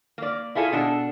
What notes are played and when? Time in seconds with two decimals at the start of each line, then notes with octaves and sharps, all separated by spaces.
0.18 A#3 D5
0.55 E4 F4 G#4 A4
0.72 B2 D4 A4